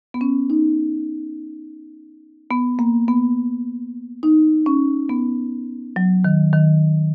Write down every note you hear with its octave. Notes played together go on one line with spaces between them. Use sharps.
B3
C#4
D#4
B3
A#3
B3
D#4
C#4
B3
F#3
D#3
D#3